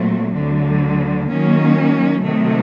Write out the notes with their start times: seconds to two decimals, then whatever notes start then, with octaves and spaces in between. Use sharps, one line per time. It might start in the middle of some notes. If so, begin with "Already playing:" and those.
Already playing: A#2 F#3 A3 C4
0.36 D2 D3 F#3
1.30 D#3 F#3 A#3 C#4
2.23 C3 D#3 F#3 A3